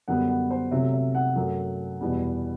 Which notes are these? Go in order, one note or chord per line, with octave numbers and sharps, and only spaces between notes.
F#2 D3 G3 B3 F#5
F#5
C5
C3 F#3 A3 E5
E5
F#5
F#2 F#3 A3
E2 B2 G3 B3